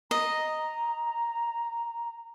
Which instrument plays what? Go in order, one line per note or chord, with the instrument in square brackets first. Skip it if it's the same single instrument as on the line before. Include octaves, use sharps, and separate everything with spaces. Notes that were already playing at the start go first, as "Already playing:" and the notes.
[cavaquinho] D#5 [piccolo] A#5